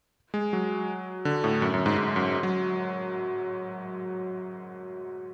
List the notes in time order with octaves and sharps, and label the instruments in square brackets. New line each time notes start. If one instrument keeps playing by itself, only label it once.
[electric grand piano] G#3
F#3
D3
A2
F#2
F#2
G#2
G#2
F#2
F#3